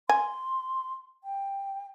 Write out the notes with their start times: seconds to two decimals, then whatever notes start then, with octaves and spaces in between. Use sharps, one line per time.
0.09 G#5 C6
1.24 G5